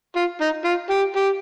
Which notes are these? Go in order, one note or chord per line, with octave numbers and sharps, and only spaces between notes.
F4
D#4
F4
G4
G4